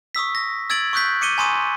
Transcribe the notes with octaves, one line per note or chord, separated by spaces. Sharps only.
C#6 D#6 E6 B6
A#6
E6 G#6 A6 D7 F#7
C#6 D#6 F#6 G6 B6
D6 C#7 D#7 G7
G#5 A#5 C6 C#6 D#6 D#7